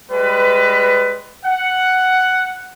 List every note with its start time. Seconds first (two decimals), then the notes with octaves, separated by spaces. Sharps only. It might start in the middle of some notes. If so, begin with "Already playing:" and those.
0.10 G3 G#3 B4
1.44 F#5